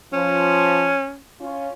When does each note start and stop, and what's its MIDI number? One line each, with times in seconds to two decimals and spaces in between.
0.13 0.92 53
0.13 1.18 61
1.41 1.70 61
1.41 1.70 65